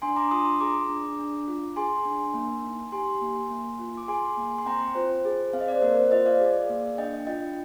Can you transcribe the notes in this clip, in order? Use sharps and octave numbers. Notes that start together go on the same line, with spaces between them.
D4 G#5 C6
A#5 D6
F4 C6 D#6
C6 D#6
G#4 A#5 D6
D4
D4
F4
G#4 G#5 C6
D4
A#3
D#4
G4 G#5 C6
A#3
A#3
F4
D6
G#4 G#5 C6
A#3
C6
C4 G5 A#5
F4 C5
G#4
C4 F5
D#5
D5
C5
A#3 A#4
C5
F4 C5 D#5
D5 F5
G#4
A#3
D4 D#5 G5
F4 D#5 G5